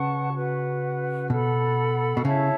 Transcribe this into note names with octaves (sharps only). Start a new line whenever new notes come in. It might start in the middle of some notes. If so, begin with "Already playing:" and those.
Already playing: C#3 B4 F#5 A5 C#6
F#4 B4 F#5
B2 A4 F#5 B5
B2
C#3 E4 C#5 E5 A5